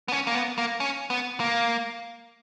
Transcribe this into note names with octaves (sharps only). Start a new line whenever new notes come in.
B3
C#4
A#3
B3
A#3
C#4
B3
A#3